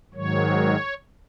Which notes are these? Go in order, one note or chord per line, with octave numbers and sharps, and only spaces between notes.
G#2 D#3 F#3 C#5